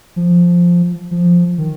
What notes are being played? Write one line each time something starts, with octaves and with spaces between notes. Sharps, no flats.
F3
F3
D#3